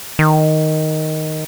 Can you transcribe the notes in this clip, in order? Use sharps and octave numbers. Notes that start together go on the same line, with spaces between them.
D#3